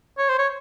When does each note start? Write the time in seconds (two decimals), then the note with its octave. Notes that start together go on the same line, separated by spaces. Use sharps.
0.18 C#5
0.29 C5
0.39 C#5